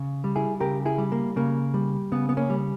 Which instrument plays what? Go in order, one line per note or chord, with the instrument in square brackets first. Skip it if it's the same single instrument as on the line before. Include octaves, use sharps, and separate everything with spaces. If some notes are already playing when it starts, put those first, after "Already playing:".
Already playing: [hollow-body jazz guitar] C#3
G3
E4 G#4
C#3 G4 A#4
E4 G#4
G3
A#3
C#3 A#3
G3
C#3 B3
B3
A#3 C#4
G3